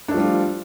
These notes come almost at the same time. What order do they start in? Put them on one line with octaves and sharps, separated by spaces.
D4 A3 F3 G3 F4